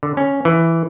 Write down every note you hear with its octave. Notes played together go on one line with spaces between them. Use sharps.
D3
C#4
E3